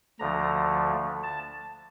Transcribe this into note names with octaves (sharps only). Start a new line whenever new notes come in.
D2 D3 F3 A3 A#5
A5